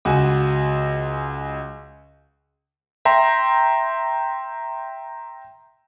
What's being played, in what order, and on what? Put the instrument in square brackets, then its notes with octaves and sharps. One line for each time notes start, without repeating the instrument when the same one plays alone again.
[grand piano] C#2 F#4 G#5
[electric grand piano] E5 G5 A#5 C6